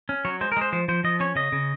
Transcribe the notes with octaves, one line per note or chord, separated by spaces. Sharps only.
C#4
F#3 C#5
G#3 C5
A#4
G#3 C5
F3 C5
F3 C5
F3 D#5
C#4 C#5
C#3 D#5
C#3